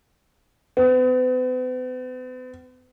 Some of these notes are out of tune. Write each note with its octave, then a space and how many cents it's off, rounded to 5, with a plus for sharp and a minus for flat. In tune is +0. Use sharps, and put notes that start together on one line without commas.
B3 +45